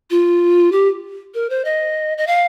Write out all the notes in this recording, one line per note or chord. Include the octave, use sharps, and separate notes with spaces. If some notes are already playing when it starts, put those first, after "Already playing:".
F4
G4
A#4
C5
D#5
D#5
F5